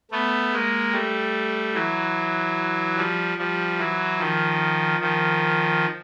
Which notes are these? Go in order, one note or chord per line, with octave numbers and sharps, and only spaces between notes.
A3 B3
G#3 A#3
G3 A3
E3 F#3
F3 G3
F3 G3
E3 F#3
D#3 F3
D#3 F3